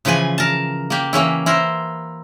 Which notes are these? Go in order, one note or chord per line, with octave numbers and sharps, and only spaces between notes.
C#3 E3 F3 B4 G#5
A#4 A5
A#3 G4
E3 A#3 C#4 E4
E4 A#4 C5